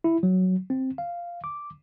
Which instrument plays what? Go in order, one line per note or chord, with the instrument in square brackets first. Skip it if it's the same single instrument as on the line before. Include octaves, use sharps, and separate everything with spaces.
[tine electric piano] E4
F#3
C4
F5
D6